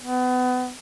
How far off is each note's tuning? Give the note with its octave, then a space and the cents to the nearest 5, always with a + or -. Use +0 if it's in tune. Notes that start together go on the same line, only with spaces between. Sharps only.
B3 +30